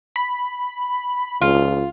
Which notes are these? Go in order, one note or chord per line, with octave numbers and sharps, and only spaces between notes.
B5
C#2 F4